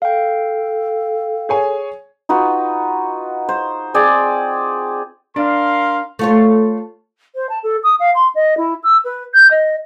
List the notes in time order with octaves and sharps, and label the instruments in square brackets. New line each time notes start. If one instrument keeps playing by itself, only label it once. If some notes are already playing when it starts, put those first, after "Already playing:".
[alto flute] A4 [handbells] F5 G5
[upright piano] G#4 C#5 G#5
[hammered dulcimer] D#4 F4 F#4 B4
C5
C4 G#4 D5 G5
[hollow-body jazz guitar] D4 [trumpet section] A#4 F5 C6
[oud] A3 F4 C#5
[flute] C5
A5
A4
D#6
F5
C6
D#5
E4
E6
B4
G6
D#5